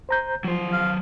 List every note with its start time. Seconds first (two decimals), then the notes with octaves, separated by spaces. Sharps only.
0.09 C5 A#5 G6
0.44 F3 F#3 C5
0.72 F5